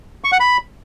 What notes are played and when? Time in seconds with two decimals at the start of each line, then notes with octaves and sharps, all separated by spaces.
0.24 C#6
0.32 F#5
0.40 B5